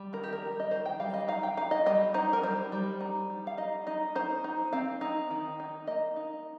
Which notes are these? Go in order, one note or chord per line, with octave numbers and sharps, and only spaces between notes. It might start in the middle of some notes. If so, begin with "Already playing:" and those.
Already playing: G3
D#3 A#4
G4
A#4
G3
D#5
D#3 C5
G5
G3 F5
D#5
D#4 F5
G5
D#4 F5
D#5
G3 D#5
D#4 C5
A#4
G3 C5
G3
D#4
G3
F5
D#4 D#5
D#4 D#5
D#4 C5
D#4
C4 F5
D#4
D#3
D#4
A#3 D#5
D#4